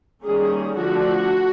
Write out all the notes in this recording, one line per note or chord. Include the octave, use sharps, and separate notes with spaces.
D#3 G3 A#3 C#4 G#4
D3 F3 A3 D4 F#4